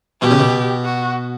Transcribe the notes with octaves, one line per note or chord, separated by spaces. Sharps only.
B2 G4
C#3
B2
F#4